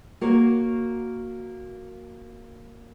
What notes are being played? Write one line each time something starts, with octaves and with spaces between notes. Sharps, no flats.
A#3 F#4 A#4 C#5